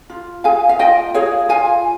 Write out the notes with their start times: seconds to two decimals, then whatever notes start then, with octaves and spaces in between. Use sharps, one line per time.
0.10 F4
0.44 G#4 F5 G#5
0.69 F5
0.79 F4 D#5 G5
1.14 G#4 C#5 F5
1.49 F4 F5 G#5